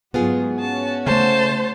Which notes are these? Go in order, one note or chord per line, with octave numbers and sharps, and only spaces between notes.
G#2 F#3 B3 F4 G#4
C#4 F#4 A5
C#3 A3 C5 A5